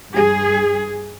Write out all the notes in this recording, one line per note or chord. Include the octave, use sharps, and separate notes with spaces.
G2 G#4